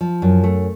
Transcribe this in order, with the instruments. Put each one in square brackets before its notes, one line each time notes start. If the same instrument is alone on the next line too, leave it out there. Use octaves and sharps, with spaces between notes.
[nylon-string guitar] F3
F#2
A3